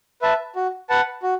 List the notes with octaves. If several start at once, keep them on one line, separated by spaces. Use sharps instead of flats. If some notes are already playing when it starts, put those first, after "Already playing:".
B4 E5 A5
F#4
B4 F#5 A5
F#4